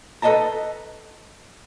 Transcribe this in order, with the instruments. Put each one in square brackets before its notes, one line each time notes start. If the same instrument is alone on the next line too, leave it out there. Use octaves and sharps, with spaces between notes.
[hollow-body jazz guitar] A4 B4 C#5 D#5 A5 A#5